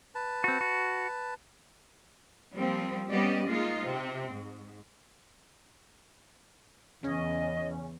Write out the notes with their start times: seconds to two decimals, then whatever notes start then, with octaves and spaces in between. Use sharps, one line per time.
0.15 B4 A5
0.44 C4 F#4
0.61 F#4
2.55 F3 G3 A#3 C4
3.10 G3 B3 C#4 G4 D5 D#5
3.47 G#3 A#3 D#4 F4
3.84 C3 C4
4.33 G#2
7.03 E2 C#3 C#4 D#5